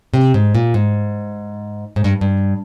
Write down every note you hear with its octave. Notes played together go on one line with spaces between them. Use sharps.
C3
G#2
A#2
G#2
G#2
G2
G2